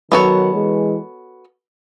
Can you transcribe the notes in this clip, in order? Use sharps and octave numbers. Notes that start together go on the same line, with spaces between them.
D#3 F#3 B3 F#4 A4 C#5
E3 G#3